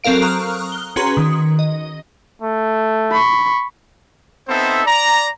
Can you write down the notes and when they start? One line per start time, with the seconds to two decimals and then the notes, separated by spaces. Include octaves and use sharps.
0.04 F#3 C4 A4 A#4 F5 D7
0.22 A#5 C#6 D#6 F6 F#6
0.72 G7
0.96 C#4 F#4 G#4 B4 A#5 C6
1.17 D#3
1.59 D#5
2.42 A3
3.12 B5 C#6
4.48 B3 C4 D#4 A4 C5 E5
4.86 D5 A#5